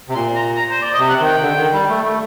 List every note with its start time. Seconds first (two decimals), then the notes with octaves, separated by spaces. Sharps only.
0.09 C3
0.14 A#2 C6
0.36 A#5
0.57 A#5
0.70 C5
0.82 D5
0.94 D#5
0.99 C3
1.09 F#5
1.21 D#3 G5
1.41 D3
1.57 D#3
1.73 G3
1.89 A3
2.04 A3